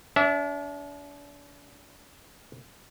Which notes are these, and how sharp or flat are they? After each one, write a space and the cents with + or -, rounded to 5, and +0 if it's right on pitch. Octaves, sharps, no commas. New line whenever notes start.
D4 -40 E5 -5